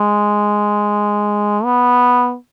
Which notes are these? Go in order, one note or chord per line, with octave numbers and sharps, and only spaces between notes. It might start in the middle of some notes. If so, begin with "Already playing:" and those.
Already playing: G#3
B3